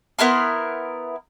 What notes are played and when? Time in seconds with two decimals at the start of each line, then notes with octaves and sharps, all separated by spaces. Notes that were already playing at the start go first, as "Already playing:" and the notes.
0.19 B3 E4 A#4 C6